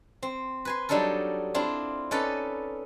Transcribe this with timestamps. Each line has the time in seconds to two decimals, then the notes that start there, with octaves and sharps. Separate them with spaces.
0.23 C4
0.65 B4 G#5 C6
0.89 F#3 G3 D4 D#4 A4 A#4
1.54 C4 D4 E4 F4
2.11 C#4 D#4 A4 B4 D5